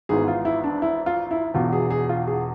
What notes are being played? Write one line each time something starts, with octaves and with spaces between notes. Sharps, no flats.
G#1 G#2 E3 B3 G#4
F4
E4
D4
E4
F4
E4
E1 E2 B2 F4
G#4
G#4
F4
G#4